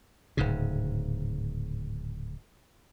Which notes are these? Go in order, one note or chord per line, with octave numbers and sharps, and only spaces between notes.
D1 G#2 C#3